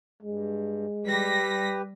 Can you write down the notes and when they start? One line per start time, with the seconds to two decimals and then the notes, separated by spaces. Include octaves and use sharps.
0.22 G2 G#3
1.05 G3 G4 B4 A#6 B6